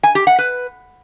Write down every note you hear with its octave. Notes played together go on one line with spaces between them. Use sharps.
G#5
G4
F#5
B4